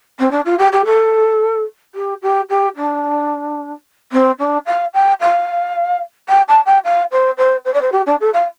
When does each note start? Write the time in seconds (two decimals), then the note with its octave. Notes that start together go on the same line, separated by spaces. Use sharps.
0.19 C4
0.31 D4
0.45 F4
0.58 G4
0.72 G4
0.85 A4
1.94 G4
2.22 G4
2.49 G4
2.76 D4
4.12 C4
4.38 D4
4.66 F5
4.93 G5
5.20 F5
6.28 G5
6.48 A5
6.65 G5
6.84 F5
7.11 C5
7.37 C5
7.64 C5
7.73 D5
7.81 C5
7.92 G4
8.06 D4
8.20 A4
8.33 F5